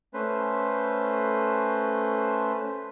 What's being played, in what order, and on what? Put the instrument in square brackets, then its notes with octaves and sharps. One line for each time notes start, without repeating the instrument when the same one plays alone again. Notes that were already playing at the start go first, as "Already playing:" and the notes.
[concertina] A3 C#4 B4 C5